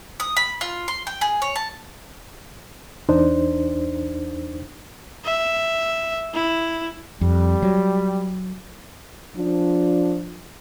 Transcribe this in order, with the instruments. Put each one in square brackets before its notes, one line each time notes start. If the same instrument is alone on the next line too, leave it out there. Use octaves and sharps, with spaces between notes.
[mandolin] D#6
B5
F4
C6
G5
G#4
C#5
A5
[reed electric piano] E2 D4 D#4 C5
[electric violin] E5
E4
[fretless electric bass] F2 [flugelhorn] G3
[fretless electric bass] F#3
[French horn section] F3 D4